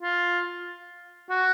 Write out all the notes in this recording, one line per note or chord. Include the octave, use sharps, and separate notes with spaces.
F4
F#4